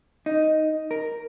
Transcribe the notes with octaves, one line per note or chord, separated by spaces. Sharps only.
D#4
A#4